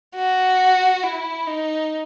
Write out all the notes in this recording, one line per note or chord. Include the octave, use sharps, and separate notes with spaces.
F#4
E4
D#4